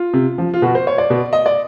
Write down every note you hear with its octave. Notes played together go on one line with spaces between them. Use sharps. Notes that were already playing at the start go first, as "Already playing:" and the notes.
Already playing: F4
C3
F3
F4
B2 F#4
C5
C#5
D5
B2
D#5
D5